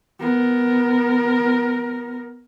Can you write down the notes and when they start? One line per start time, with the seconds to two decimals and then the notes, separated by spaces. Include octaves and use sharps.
0.20 B3 A#4